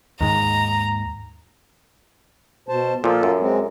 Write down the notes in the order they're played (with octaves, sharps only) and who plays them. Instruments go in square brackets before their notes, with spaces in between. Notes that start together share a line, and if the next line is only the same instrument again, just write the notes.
[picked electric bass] D#2 G#2 D#3 [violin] A#5
[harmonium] B2 C5 A5
[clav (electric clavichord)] A#2 F3 [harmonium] F4 A4
[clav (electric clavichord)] F#2
[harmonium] G#3 C4